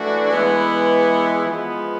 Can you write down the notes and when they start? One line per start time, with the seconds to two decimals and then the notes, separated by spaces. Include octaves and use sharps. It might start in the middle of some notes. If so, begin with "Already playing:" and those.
Already playing: E3 A3 D4 F#4
0.30 E3 G#3 B3 E4
1.45 F3 G#3 B3